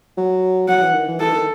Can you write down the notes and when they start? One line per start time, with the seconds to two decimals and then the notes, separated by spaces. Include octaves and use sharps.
0.17 F#3
0.68 F#3 F#5
0.82 E3
0.94 D#3
1.08 E3
1.20 E3 A4
1.33 D#3